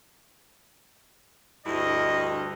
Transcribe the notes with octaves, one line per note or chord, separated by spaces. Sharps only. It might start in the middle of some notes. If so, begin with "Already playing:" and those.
D2 G2 E4 D#5